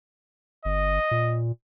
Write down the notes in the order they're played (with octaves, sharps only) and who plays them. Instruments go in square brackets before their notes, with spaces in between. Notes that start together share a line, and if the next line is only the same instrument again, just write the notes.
[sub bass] G1 [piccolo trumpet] D#5
[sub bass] A#2